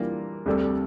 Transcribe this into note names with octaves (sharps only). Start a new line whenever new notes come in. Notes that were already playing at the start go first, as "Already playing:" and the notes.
Already playing: E3 G3 A#3 D4 F4
D2 C3 G3 D4 A4